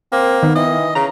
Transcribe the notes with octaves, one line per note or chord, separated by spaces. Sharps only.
A#3 C4
D#3 B3
E3 D#5
C#3 A#5